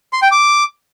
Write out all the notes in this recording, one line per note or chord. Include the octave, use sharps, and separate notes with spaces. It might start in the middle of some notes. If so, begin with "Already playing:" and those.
C6
G5
D6